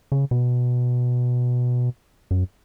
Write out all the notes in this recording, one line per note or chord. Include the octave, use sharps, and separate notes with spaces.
C#3
B2
F#2